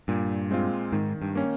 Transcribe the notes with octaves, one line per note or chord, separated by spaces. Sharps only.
G2 A#2
G#3 C4 F4
G#2 D#3
G2
A#3 C#4